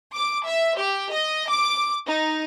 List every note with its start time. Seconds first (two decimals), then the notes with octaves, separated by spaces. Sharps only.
0.15 D6
0.47 E5
0.78 G4
1.11 D#5
1.49 D6
2.07 D#4